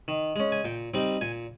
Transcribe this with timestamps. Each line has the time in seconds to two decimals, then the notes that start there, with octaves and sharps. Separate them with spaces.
0.08 D#3
0.36 G#3 C#4
0.52 G#5
0.65 A#2 G5
0.94 G3 C4 D#4 G5
1.21 A#2 G#5